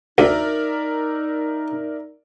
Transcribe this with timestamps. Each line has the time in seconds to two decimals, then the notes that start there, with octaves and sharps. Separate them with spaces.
0.18 D2 D#4 A#4 D5 E5